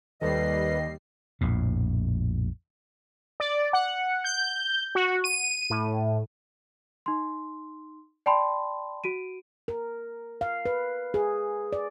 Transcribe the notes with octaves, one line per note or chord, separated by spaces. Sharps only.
D#2 D#3 G3 A4 B4 C5 D#5 C7
A#1 F2 A2
D5
F#5
G6
F#4
D#7
A2
D#4 C6
D5 G5 A5 B5 C6
F#4 D7 D#7
A#4
F5
B4
G#4
D5